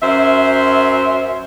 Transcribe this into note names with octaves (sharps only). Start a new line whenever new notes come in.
F#2 C5 E5